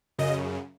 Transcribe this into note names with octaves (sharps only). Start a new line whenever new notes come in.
F#2 C#3 D#5